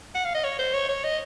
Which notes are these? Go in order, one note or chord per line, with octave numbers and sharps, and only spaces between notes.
F#5
F5
D#5
C#5
C5
C#5
C#5
D#5